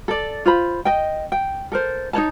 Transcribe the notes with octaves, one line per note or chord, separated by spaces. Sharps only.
A4 D5
F4 C5 B5
D#5 G5
G5
A4 A#4 C5
D#4 C5 C#5 A5